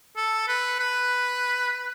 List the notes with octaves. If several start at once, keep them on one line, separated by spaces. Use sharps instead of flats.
A4
B4
B4